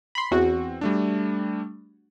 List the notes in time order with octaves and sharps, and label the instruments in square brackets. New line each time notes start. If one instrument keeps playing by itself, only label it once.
[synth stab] B5 C6
[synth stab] E2 F#4 [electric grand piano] C4
[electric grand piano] G3 A3 D4